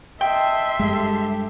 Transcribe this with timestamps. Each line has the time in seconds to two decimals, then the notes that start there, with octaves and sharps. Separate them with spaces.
0.21 D#5 E5 G5 A5 C6
0.80 G2 G#3 G4 A4